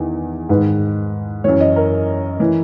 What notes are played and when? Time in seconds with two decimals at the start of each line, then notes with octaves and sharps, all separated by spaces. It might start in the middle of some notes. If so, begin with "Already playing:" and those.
Already playing: E2 D#3
0.49 G#2 D#3 B4
1.44 F#2 E3 C#5
1.60 D#5
1.76 A#4
2.40 E3